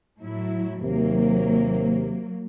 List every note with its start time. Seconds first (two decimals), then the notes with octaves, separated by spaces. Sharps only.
0.22 A2 F#3 E4
0.81 D#2 C3 F#3 A#3